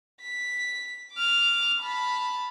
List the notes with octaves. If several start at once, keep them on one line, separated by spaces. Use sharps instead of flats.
B6
D6 F6
A5 B5